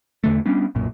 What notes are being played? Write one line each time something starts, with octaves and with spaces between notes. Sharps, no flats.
E2 D3 A3
G3 B3 C#4 D4
B1 F#2 A#2